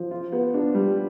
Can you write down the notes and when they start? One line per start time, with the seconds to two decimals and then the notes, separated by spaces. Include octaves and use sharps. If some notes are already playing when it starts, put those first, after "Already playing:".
Already playing: F3
0.11 F4
0.32 B3
0.54 D4
0.74 G3